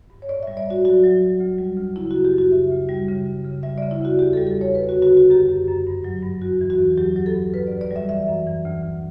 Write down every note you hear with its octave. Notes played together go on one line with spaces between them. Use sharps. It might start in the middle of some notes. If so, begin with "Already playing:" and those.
G2
C#5
A2 D5
E5
G3
D5
A2 F#4
F#3 F#4
F#3
F#3
D2
G3
D2
C#3 E4
F#4
F#2
G4
F#2 F#4
C#3 E5
D2
G3
C#3
C#3
C#3
G3 E5
D5
C#3
E4
D2 F#4
E2 G4
A4
G3
A4
E2 C#5
D2 B4
F#4
D3
F#4
D2 F#4
F#2 G4
F#2
F#2
G2
F#3
G2
E2 F#4
E3
F#4
E2
F#3 G4
F#3
A4
G2
D2 B4
D5
D2
D5
G3
E5
E3 E5
F#2
E3
D2
D2